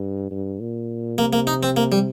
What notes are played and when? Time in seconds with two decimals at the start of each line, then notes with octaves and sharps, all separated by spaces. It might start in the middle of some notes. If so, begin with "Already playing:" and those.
Already playing: G2
0.31 G2
0.60 A#2
1.18 C3 A#3
1.33 A#3
1.47 D#4
1.63 C4
1.77 A#3
1.92 G3